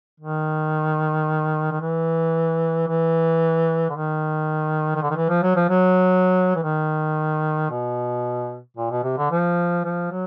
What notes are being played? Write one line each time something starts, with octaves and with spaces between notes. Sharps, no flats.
D#3
D#3
E3
E3
D3
D#3
D#3
D3
D#3
E3
F3
F#3
F3
F#3
E3
D#3
B2
A#2
B2
C3
D3
F3
F3
F#3